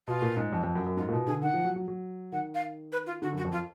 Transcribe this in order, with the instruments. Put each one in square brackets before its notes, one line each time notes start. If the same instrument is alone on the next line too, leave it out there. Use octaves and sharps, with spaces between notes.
[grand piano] B2 [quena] F4
[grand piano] A#2
G#2
F2
F2
F#2
F#2
[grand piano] G#2 [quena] F4
[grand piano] A#2
B2
[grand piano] D3 [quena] G#4
[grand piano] D#3 [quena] F#5
[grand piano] F3
F#3
F#3
F#3
[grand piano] D#3 [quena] F#5
[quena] F5
B4
F4
[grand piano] D3 [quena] F#4
[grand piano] F#2 [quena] F#4
[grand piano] F2
[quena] F4